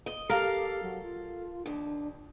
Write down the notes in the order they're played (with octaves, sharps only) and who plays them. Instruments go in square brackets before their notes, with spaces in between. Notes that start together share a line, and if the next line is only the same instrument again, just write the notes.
[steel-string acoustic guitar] D#5
[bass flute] G4 [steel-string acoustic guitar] A4 F5 [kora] A#4
[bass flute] F#3
F4
[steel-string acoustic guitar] D#2 [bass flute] D4